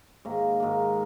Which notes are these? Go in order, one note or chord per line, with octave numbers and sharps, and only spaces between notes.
G#2 D#3 A#3
G#2 D#3 A#3